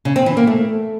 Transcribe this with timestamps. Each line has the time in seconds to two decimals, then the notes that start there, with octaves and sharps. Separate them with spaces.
0.05 C#3
0.16 C4
0.26 E3
0.37 A#3
0.47 A3